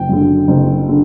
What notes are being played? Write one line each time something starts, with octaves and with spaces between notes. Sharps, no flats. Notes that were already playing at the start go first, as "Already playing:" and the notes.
Already playing: F#1 G5
F#2 D3
F#1
D3